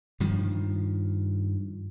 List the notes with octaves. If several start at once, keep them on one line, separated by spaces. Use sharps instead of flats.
G2 D#3 F3